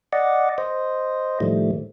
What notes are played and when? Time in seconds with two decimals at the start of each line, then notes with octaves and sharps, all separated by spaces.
0.13 D5 D#5 F#5
0.58 C5 D#5
1.40 A2 D#3 F3 G3 A3